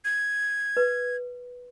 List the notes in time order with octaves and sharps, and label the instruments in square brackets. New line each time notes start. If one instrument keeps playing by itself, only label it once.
[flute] G#6
[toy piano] B4